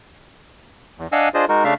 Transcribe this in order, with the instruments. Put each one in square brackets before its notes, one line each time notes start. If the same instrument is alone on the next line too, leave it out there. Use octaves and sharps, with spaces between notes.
[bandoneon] E2
D4 D#5 F5 F#5 G#5 E6
D4 F4 G#4 C5 D#5
G#3 D#4 F#4 A#4
C#3 A3 D4 E5 F5